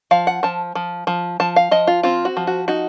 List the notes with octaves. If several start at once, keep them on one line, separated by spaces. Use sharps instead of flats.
F3 F5
F#5
F3 A5
F3
F3
F3 A5
F5
F3 D#5
F4
C4 F4
F#4
F3
F#4
D#4 F#4